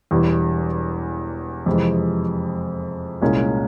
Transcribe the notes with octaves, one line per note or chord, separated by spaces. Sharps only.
E1 E2 E3 G3
F2 C3 E3 G#3
C2 A#2 G#3 C#4